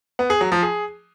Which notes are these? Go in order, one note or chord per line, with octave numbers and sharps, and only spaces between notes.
B3
G#4
F#3
F3
G#4